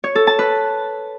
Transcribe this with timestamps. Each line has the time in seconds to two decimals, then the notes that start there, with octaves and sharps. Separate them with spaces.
0.04 C#5
0.15 A4
0.27 A5
0.39 B4